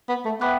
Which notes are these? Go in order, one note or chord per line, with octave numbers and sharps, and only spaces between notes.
B3
A3
B3 E5 G5 B5 D6 F#6